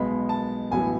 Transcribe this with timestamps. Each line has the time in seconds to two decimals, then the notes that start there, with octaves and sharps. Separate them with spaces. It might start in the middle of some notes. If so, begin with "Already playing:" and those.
Already playing: B1 B2 G#3 B3 B5
0.29 A5
0.71 A1 A2 F#3 B3 G#5